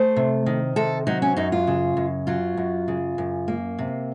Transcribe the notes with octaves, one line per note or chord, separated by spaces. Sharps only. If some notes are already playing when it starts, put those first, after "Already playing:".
Already playing: A3 C5
C3
D#3
C3 A4
F#3 D#4
C#4
F#2 D#4
F4
C#3
F#2
F#3 F4
F#2
C#3
F#2
A#3
C3